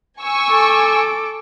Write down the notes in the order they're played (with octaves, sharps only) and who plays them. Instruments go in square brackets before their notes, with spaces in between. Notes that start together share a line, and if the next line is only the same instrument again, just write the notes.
[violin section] G#5 C#6 E6
[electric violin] A4 D6